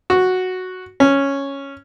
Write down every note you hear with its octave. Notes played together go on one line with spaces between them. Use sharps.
F#4
C#4